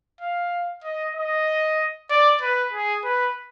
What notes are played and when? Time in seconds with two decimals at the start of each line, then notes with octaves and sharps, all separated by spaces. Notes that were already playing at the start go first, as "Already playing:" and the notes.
0.21 F5
0.84 D#5
1.15 D#5
2.10 D5
2.41 B4
2.73 G#4
3.04 B4